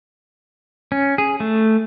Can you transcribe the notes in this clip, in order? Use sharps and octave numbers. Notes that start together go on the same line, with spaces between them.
C#4
G#4
A3